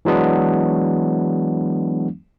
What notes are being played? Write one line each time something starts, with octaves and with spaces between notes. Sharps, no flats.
E3 F#3 G#3 B3 D4